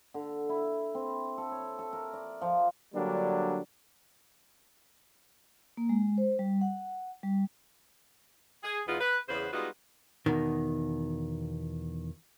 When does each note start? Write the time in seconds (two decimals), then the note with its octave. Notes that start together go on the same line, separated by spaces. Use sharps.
0.14 D3
0.49 E4
0.95 C4
1.38 A4
1.51 C#5
1.79 A4
1.93 A#4
2.13 D5
2.41 F3
2.94 D3 F#3 G3 A#3 D4
5.77 A#3
5.89 G#3
6.18 C5
6.39 G3
6.61 F#5
7.23 G3
8.64 G#4
8.87 E2 G#3 B3 D#4 F4
9.00 B4
9.29 E2 C#3 B3 B4 C5
9.53 G3 G#3 B3 D#4 F4 F#4
10.26 E2 B2 D#3